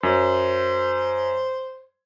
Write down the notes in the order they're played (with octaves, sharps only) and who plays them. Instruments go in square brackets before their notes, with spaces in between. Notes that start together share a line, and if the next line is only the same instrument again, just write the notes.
[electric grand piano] F#2 [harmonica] C5